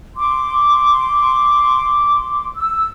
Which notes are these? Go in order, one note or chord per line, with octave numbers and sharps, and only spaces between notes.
C6 D6
E6